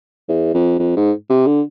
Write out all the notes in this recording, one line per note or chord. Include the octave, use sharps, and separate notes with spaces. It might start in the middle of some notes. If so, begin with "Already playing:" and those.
E2
F2
F2
G#2
C3
D3